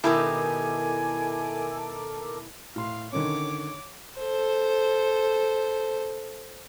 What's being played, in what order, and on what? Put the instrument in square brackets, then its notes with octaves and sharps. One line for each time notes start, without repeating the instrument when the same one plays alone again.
[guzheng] B2 D#3 G4 [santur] E4 [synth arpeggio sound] A4 A#4 D6 [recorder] G#5
[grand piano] A2 C6 [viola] F5
[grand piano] D3 D#3 C#4 [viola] C#5 D6
[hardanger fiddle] A4 C5